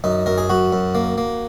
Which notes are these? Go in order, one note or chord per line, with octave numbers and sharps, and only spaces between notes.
F#2 D#4
F#2 A#4
G#4
F#2 F#4
F#2
A#3
A#3